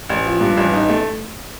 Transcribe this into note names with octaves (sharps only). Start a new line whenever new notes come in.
A1
F3
G2
A1
D#4
A3